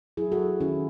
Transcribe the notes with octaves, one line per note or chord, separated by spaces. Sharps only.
F#3 E4 G#4
F#4 A4
F#3
D#3 C#4 E4